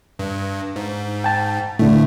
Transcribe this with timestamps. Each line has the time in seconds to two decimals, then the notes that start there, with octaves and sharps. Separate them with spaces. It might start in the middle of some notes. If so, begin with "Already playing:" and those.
0.19 G2
0.76 G#2
1.24 G5 A5
1.79 A2 D3 A3